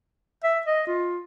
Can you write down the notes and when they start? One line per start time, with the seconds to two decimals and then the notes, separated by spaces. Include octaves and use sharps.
0.44 E5
0.66 D#5
0.87 F4